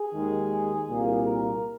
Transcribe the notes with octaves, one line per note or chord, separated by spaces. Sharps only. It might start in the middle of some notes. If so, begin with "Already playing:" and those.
Already playing: G#4
D#2 D#3 G#3
C2 A#2 A#3
A#4